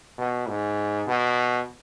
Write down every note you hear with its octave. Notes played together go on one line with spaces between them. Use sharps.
B2
G#2
B2